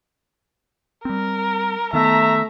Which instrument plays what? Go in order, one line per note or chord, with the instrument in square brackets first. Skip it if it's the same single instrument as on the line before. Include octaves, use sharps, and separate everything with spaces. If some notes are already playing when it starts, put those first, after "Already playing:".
[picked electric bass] G3 C4 [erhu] A#4
[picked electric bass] D#3 B3 [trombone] A3 [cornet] E5 [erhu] A#5